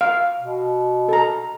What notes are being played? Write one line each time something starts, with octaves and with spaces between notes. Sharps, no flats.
F5
B2
A4 A#5